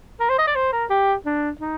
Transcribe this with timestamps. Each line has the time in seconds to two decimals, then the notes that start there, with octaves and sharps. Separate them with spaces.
0.20 A#4
0.29 C5
0.39 D#5
0.47 D5
0.55 C5
0.73 A#4
0.90 G4
1.26 D4
1.61 D#4